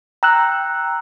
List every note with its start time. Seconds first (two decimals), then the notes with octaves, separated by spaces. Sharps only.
0.23 G5 A#5 E6 F#6